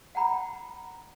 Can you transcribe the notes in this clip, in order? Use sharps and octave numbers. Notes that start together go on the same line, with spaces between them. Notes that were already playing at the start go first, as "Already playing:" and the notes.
F#5 G5 A#5 B5